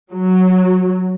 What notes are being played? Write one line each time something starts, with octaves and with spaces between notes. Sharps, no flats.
F#3